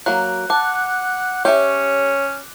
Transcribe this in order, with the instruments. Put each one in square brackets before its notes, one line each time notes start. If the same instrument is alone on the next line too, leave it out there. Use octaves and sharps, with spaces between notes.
[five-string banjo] F#3 A#3 [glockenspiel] F#6
[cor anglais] F#5 [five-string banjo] A5 [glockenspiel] D6 F#6
[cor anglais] C#4 [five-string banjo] G4 E5 [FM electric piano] C#5